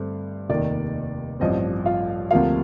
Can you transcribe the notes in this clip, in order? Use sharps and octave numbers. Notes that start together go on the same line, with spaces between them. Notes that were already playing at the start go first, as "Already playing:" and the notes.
Already playing: G2 D3 A3 C4
F1 D#2 D#3 D5
A1 G2 F3 C4 D#5
F4 F5
D2 C3 F3 A#3 F4 F5